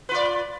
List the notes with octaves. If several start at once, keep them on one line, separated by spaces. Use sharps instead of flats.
F4 B4 D5